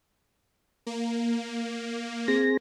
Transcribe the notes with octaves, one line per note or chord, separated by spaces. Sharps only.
A#3
C4 G#4 A#6